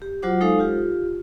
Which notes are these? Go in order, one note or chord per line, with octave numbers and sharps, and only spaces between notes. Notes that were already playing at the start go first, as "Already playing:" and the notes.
G4
F#3 F4 F#4 C5 F#5 D6
G#3 D#4 A4 C5 F5
F4 G4